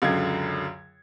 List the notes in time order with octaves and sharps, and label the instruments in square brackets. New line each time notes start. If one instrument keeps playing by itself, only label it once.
[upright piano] C#2 F#2 D3 G#6